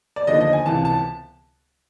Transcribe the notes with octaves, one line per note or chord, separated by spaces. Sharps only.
D5
D#2 D3 F3 D#5
D#5
G#5
C#2 C3 E3 A5
A5